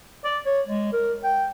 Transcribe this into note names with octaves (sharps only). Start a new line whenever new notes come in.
D5
C#5
G#3
A#4
G5